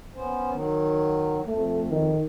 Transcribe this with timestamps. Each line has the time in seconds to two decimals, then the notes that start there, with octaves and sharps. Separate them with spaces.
0.15 B3 C#4 C5
0.52 D#3 F#3
1.46 F2 A3
1.90 D#3